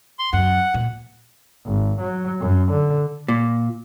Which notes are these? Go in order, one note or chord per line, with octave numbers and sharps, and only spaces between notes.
C6
F#2 F#5
A#2
G#1
F#3
F#2
D3
A#2